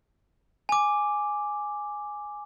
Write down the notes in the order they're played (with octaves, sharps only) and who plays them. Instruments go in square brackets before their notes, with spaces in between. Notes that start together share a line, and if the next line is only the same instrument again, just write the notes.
[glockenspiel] G#5 D6